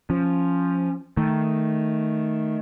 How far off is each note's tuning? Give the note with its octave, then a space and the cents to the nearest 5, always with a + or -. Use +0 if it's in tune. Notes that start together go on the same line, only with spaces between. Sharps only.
F3 +0 C#4 -5
D#3 +0 A3 +0